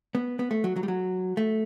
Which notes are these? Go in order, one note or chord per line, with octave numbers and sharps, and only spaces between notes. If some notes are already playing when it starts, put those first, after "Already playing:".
B3
B3
A3
F#3
F#3
G3
F#3
A3